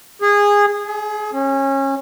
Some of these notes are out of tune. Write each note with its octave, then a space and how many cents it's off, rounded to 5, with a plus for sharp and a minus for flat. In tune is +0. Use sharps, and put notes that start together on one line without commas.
G#4 -20
G#4 +30
C#4 -25